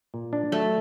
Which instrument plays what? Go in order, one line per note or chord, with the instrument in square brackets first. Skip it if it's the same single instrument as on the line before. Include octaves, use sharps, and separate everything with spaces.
[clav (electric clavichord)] A#2
D4
[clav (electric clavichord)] F#3 [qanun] A3